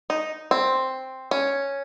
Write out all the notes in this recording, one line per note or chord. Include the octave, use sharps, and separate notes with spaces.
D#4
C4
C#4